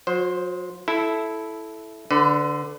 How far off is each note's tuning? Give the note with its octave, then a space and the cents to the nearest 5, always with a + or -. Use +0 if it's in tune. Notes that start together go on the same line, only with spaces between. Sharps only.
F#3 -40 C5 +0
E4 +0 A4 -10
D3 +0 B4 +35